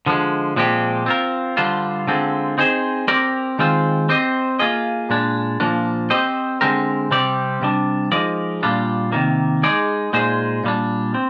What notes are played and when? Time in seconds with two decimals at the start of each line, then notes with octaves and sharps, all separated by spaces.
0.06 D3 F3 G#3
0.56 A#2 F3 G#3 C4 G4
1.06 C4 F4 A#4
1.57 D3 G3 D4 F4 C5
2.07 D3 G#3 C4 F4
2.58 C4 D#4 G#4 C5
3.08 C4 G4 A#4 D5
3.59 D#3 G#3 C4 F4 C5
4.09 C4 G4 C5 D#5
4.59 A#3 F4 G#4 D#5
5.10 A#2 G#3 D4
5.60 A#2 F3 A#3 D4
6.10 C4 G4 C5 D#5
6.61 D3 G#3 C4 G4 A#4
7.11 C3 G3 C4 G4 D5
7.62 C3 G3 D4
8.12 F3 G#3 D#4 A#4 D5
8.63 A#2 G3 D4 F4
9.12 C3 D#3 A#3
9.63 G#3 D#4 G#4 D5
10.13 A#2 G#3 D#4 G#4 C5
10.64 A#2 G3 D4
11.14 C4